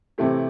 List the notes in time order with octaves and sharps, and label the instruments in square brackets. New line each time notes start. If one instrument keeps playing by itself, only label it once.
[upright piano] C3 E3 A3 C4 G4